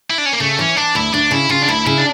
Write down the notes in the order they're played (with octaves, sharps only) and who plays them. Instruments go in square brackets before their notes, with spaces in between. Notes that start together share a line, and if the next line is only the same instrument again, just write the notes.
[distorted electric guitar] E4
D4
C#4
A#3
[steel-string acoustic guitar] C#3 [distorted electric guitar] A3
[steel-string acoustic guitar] E3 [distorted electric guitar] C#4
[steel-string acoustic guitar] E3 [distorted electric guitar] D4
[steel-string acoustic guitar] D2 [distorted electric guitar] E4
[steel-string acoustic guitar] D2 [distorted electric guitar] D4
[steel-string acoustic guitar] C#3 [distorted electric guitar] E4
[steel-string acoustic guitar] C#3 [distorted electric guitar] F4
[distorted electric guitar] D4
[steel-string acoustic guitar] D2 [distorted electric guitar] E4
[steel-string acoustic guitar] C#3 [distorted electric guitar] E4
[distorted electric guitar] D4